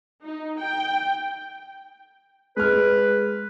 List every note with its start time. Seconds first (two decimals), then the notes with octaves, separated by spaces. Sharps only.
0.23 D#4
0.60 G5
2.57 G#3 B4 F6